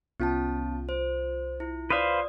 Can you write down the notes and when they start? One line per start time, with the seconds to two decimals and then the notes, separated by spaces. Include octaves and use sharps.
0.20 C2 B3 C#4 F4 A5
0.89 C5
1.60 E4
1.90 B4 C5 D5 F5 D#6